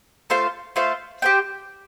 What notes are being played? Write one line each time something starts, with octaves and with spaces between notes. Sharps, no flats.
A3 F4 C5 F5
A3 F4 C5 F5
G4 C5 G5